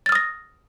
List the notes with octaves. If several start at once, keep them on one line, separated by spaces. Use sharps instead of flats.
D#6 F6 A6 A#6